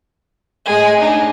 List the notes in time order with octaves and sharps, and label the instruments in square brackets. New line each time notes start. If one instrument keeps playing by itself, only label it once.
[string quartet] A2 G#3 [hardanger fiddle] G#4
[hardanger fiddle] D4 D#4